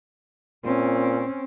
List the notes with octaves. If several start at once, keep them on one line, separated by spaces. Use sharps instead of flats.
A#2 C4 C#4